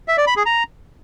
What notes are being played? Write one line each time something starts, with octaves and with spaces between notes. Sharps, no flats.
E5
D5
B5
G#4
A#5